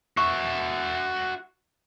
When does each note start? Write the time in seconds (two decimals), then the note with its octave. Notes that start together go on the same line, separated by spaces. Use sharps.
0.17 F#4 E5 C#6